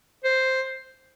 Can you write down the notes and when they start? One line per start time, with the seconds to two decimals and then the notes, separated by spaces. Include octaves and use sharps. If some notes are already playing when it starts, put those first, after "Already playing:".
0.24 C5